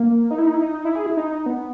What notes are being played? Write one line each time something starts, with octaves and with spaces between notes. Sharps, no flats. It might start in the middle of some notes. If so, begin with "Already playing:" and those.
Already playing: A#3
D#4
E4
D#4
E4
D#4
D#4
E4
G#4
E4
D#4
D#4
B3